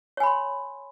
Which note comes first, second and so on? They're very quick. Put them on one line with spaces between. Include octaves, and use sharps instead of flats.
C#5 G#5 B5 C6